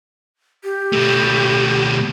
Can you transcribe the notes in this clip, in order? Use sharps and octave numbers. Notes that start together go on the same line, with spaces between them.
G4
B2 A3